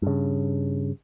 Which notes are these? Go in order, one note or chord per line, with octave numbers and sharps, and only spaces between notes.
G2 C#3